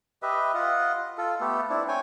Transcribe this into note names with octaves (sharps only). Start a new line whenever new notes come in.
G4 B4 D#5 E5
F4 D#5 F#5
F4 A4
A3 B3 G4 A4
C4 D4 E4
C#5 G5 G#5